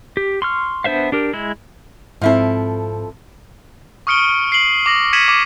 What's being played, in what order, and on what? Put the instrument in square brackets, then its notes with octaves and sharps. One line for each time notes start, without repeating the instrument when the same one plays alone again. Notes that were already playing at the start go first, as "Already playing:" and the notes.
[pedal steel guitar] G4
C6 C#6 F6
B3 D4 C5 E5 F5
D4 G4 A#4
G#3 E4
[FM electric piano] G#2 C4 [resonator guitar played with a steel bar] F3 E4 A4
[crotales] C#6 D#6 F6 C#7 D7 G7
C7 F#7
D6 A#6 F#7
G#6 B6 C#7 D#7 E7 F#7
D6